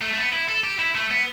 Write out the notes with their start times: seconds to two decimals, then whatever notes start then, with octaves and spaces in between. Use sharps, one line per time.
0.01 A3
0.13 A3
0.17 B3
0.33 E4
0.49 A4
0.64 G4
0.79 E4
0.95 A3
1.10 B3